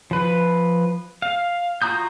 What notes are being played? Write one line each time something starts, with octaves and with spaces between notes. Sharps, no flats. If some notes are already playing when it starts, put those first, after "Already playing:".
F3 B4
F5
F4 F#4 A#5 D#6 G6